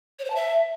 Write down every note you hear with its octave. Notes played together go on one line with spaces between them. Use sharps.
C#5
C5
A5
E5